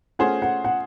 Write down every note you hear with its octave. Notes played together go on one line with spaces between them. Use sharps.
A3 C#4 F4 G#4 C5 F#5
F#5
F#5